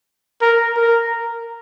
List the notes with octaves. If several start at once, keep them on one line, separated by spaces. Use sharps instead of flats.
A#4
A#4